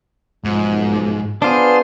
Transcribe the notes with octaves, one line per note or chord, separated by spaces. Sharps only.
B1 G#2 F3
B3 D4 F4 G#4 C5